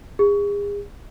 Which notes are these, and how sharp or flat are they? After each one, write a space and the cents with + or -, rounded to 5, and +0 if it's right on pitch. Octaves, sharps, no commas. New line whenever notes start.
G#4 -35